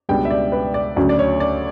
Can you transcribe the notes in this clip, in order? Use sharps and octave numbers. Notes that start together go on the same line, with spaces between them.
C#2 B2 G3 B3 D4 G5
E5
D5
B4
D5
D2 C#3 F#3
D5
C#5
D5